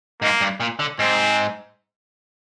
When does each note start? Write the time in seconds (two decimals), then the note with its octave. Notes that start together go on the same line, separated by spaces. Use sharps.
0.22 G#2 A#3
0.41 G2
0.60 A#2
0.79 D3
0.99 G#2 C4